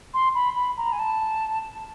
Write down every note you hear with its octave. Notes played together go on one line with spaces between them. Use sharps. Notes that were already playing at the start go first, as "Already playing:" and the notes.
C6
B5
B5
A#5
G#5
A5